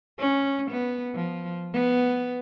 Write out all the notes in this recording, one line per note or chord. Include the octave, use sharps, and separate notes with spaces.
C#4
B3
F3
B3